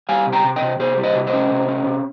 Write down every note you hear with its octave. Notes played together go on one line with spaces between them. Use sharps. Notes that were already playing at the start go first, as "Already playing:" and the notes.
G3 F5 G#5
C3
G5 A#5
C3
D#5 G5
C3
C3 G#4 C5
G3
C5 D#5
C3
C5 D#5
C#4
C3
C#4
C3